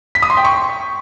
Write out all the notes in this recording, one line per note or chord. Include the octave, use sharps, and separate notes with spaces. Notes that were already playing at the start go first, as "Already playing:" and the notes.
B6
D#6
C6
G5
C#6